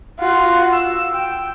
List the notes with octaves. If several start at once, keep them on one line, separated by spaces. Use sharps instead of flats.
F4 F#4
E6
G5